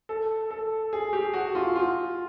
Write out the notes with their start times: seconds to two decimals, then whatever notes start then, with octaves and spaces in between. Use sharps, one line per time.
0.09 A4
0.51 A4
0.93 G#4
1.13 G4
1.34 F#4
1.55 F4
1.76 F4